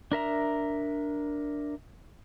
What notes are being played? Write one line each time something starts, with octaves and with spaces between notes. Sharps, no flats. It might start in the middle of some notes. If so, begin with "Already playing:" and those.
D4 A#4 E5 A#5